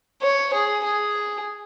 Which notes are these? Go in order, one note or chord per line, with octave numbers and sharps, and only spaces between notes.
C#5
G#4
G#4